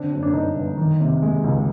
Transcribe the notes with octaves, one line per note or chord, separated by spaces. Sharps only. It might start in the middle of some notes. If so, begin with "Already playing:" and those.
Already playing: D3 C4 D4
F#2 C#4
D4
G1 C#4 D#4
G1
D#3
C3
G#3
C#2